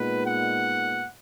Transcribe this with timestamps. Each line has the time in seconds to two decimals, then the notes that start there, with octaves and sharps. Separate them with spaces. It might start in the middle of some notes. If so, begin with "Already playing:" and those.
Already playing: A#2 G#3 B3 D#4 B4
0.24 F#5